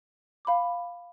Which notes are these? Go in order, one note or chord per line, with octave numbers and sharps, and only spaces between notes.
F5 B5 D6